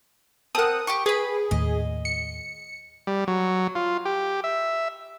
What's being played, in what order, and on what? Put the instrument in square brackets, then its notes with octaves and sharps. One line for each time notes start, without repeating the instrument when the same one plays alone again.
[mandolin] C4 F#5 [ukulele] A#4 A5 [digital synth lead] D#6
[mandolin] G4 G5 C#6
[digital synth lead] G#4 [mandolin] B4 B5
[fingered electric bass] D#2 A2 [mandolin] D#5
[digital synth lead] C#7
[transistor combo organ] G3
F#3
F4
G4
E5